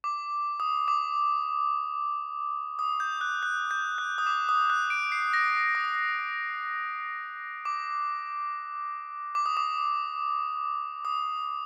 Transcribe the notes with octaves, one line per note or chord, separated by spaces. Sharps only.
D6
D#6
D6
D#6
G6
F#6
F#6
G6
F#6
D#6
D6
D#6
F#6
D7
C7
A#6
D#6
D6
D6
D#6
D6
D#6